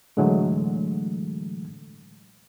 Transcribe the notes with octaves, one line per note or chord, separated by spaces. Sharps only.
A2 D3 E3 F#3 G#3 A3